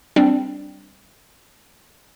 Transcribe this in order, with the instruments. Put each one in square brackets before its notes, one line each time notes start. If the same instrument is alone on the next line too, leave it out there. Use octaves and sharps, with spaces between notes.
[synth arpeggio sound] G3 C4 D4